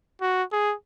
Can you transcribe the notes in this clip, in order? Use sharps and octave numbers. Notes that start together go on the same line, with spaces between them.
F#4
G#4